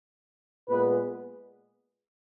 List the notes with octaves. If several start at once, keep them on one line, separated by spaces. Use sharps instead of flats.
A#2 G#3 B3 B4